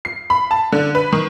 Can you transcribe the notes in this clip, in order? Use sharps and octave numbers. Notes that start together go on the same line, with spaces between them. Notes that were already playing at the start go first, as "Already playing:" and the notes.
C7
B5
A5
D3
B4
D#3